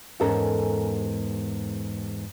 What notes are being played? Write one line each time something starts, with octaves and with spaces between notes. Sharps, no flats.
E2 G#2 C#4 A4 A#4